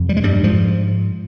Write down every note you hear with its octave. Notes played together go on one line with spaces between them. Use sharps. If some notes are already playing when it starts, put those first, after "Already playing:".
Already playing: F2 C3
G3
G#3
G2 G3
G#2 F3